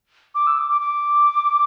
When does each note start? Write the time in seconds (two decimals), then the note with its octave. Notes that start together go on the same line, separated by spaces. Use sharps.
0.35 D6
0.47 E6
0.58 D6
0.70 D6
0.81 D6